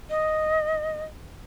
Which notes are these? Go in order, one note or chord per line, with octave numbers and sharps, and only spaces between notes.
D#5